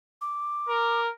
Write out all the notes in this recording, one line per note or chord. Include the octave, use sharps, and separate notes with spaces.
D6
A#4